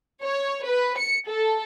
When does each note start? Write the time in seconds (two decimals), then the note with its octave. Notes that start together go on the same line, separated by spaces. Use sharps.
0.23 C#5
0.66 B4
0.98 C#7
1.29 A4